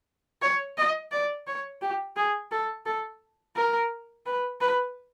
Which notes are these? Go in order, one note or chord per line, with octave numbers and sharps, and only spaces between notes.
C#5
D#5
D5
C#5
G4
G#4
A4
A4
A#4
B4
B4